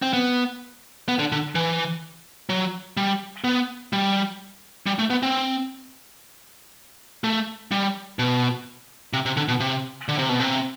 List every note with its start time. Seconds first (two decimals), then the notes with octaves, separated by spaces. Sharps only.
0.02 C4
0.13 B3
1.09 B3
1.19 D3
1.32 D3
1.55 E3
2.49 F#3
2.97 G3
3.44 B3
3.93 G3
4.86 G3
4.99 A3
5.10 B3
5.23 C4
7.24 A3
7.71 G3
8.19 B2
9.13 C3
9.26 C3
9.37 D3
9.48 B2
9.60 C3
10.08 D3
10.19 C3
10.29 B2
10.40 C3